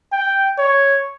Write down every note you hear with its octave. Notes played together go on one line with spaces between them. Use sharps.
G5
C#5